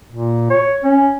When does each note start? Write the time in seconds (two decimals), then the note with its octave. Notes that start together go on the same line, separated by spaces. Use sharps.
0.12 A#2
0.50 C#5
0.84 C#4